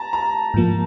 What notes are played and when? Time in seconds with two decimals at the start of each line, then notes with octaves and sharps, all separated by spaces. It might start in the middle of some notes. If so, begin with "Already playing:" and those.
Already playing: A5 A#5
0.13 A#5
0.54 G#2 F3 A#3